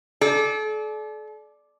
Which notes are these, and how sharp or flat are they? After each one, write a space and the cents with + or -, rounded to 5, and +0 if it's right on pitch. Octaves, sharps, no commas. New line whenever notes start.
A4 -40 D5 +0